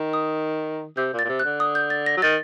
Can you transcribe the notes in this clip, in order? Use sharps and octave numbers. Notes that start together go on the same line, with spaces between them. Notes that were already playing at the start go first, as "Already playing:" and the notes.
Already playing: D#3
D#6
C3 G6
A#2
A6
A#2
C3
F#6
D3
D#6
G6
A6
A#6
F#3
D#3 A6